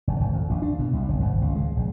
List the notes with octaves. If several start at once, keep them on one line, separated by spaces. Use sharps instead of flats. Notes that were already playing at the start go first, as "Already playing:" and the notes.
F1
G#1
F2
A#1
D4
B2
C2
F#1
G#1
C#2
G#3
A#1